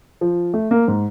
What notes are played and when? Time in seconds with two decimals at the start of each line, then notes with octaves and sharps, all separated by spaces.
0.21 F3
0.54 A3
0.71 A#3
0.88 G#2